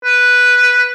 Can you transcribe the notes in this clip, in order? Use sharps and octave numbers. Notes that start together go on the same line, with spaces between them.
B4